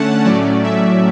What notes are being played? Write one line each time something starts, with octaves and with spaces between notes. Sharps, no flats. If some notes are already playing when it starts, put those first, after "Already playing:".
Already playing: D3 A3 C#4 F#5 A5
A2 F#3 A3 C#4 D5
E5